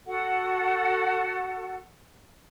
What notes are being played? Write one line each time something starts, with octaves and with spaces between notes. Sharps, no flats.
F#4 A4 F#5